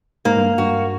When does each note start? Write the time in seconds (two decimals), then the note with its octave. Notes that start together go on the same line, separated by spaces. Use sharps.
0.25 G#2 A#3
0.37 G2
0.58 G2 F#4